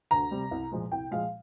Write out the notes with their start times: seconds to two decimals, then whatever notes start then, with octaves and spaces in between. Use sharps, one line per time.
0.11 D2 A#5
0.31 C3 G3
0.51 C2
0.71 A#2 F3 G#3
0.92 C2 G5
1.11 A#2 F3 G#3 F5